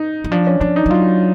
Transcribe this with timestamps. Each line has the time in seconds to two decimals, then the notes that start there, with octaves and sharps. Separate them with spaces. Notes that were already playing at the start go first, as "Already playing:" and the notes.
Already playing: D#4
0.24 E3
0.32 F3 D4
0.47 C#4
0.60 F3 D4
0.76 D#4
0.86 F3
0.90 F#3 F4